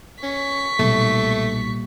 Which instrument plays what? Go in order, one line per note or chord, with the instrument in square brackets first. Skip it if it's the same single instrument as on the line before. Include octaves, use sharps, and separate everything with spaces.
[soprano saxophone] C#4 [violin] C#6 B6
[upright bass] B1 [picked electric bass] A#2 G3 [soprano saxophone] A3